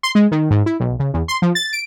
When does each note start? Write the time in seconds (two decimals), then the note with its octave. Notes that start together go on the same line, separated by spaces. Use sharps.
0.03 C6
0.15 G#3
0.32 D#3
0.50 G#2
0.66 E4
0.80 B1
0.99 C#3
1.14 E2
1.28 C6
1.42 F3
1.55 A6
1.73 D7